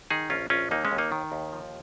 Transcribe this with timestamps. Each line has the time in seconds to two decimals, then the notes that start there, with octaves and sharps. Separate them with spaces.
0.10 D#3 D#4 G#4
0.30 A#1 C#4 F4
0.50 A#1 C#4 F4
0.71 D#2 A#3 D#4
0.85 G#3 C#4
0.91 D#2
0.98 A#3 D#4
1.12 D#3
1.32 D#2
1.53 F3